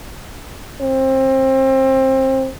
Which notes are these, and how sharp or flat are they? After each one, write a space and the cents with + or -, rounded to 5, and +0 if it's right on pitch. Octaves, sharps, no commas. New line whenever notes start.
C4 +25